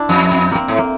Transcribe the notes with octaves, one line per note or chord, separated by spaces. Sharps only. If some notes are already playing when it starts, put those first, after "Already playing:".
Already playing: D4 E4
F2
C4
A#3 C4
A2
A#3